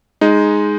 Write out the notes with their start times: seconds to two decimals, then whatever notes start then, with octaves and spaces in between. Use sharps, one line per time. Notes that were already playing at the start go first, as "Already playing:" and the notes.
0.21 G#3 D#4